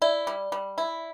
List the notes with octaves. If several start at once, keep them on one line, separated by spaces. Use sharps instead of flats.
E4 D5
G3
G3
E4